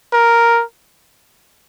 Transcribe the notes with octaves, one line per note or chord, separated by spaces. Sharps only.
A#4